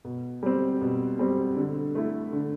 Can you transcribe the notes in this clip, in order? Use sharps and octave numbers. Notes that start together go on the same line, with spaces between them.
B2
G3 C4
B2
G3 C4
D3
A3 E4
D3